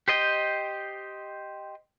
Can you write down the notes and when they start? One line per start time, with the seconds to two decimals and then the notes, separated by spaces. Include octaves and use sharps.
0.08 G4 C5 D#5 G5